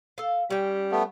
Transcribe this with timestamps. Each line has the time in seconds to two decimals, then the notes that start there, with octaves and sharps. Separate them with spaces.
0.18 A4 F5
0.51 G3 C#4 G5
0.92 A3 B3